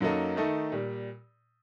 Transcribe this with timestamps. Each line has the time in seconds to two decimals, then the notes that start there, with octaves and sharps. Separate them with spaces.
0.01 F#2 F#3 A#3 D#4 A4
0.36 D#3 A3 D#4 A4
0.72 A#2 G3